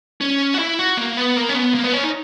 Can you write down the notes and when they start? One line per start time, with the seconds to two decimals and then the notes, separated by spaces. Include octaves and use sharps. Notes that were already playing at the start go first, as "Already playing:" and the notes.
0.21 C#4
0.54 F#4
0.59 E4
0.79 F#4
0.97 A#3
1.17 B3
1.36 A#3
1.49 C#4
1.55 B3
1.74 A#3
1.84 B3
1.93 C#4
2.04 D#4